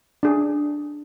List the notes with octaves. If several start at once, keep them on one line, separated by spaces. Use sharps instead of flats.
D4 G#4